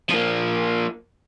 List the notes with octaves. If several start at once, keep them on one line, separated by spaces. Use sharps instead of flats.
F3 A#3